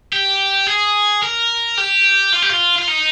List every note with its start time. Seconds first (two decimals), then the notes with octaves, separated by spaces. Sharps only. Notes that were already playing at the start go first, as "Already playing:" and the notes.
0.13 G4
0.67 G#4
1.23 A#4
1.78 G4
2.33 F4
2.42 G4
2.50 F4
2.79 F4
2.88 D#4